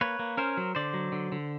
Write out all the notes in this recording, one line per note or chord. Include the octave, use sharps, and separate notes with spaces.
A#3 B4 C#5
A#3
C#4 A#4 C5
F#3
D3 C5 D5
F#3
D3
D3